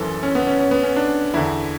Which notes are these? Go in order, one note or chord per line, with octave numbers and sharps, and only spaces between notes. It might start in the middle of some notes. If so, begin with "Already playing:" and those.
Already playing: F#2 E3 A4
C#4
B3
C#4
C#4
B3
C#4
D4
E2 D3 E4